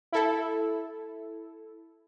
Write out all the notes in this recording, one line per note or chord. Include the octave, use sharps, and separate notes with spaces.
E4 A4